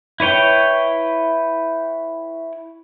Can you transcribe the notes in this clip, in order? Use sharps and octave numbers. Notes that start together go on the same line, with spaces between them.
E4 B4 C#5 G5